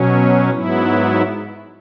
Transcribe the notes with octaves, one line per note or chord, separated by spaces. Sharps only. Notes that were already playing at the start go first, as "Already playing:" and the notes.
Already playing: B2 F#3 C#4
G#2 F#3 B3 E4